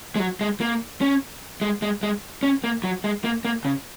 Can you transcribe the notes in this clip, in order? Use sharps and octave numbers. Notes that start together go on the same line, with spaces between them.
G#3
F#3
G#3
A#3
C#4
G#3
G#3
G#3
C#4
A#3
F#3
G#3
A#3
A#3
C#3